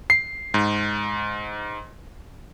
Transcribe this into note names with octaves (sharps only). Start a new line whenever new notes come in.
C7
G#2